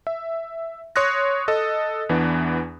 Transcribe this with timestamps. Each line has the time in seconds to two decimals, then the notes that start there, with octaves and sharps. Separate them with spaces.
0.07 E5
0.96 C#5 C6 C#6 D#6 F#6 A#6
1.48 A4 D#5
2.09 E2 E3 B3 D4